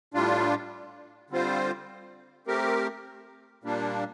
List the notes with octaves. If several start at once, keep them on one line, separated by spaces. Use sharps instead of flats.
A2 G3 D4 F4
D3 G3 C4 F4 C5
A3 C4 G4 A#4
A#2 G3 A#3 D4